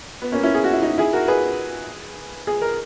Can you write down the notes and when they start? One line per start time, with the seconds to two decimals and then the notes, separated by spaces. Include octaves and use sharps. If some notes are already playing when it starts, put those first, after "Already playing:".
0.22 B3
0.32 A#3 C#4
0.43 C#4 E4
0.54 G#4
0.64 F#4
0.73 E4
0.82 D#4 F#4
0.98 E4 G#4
1.13 F#4 A#4
1.28 G#4 B4
2.47 G#4
2.62 A#4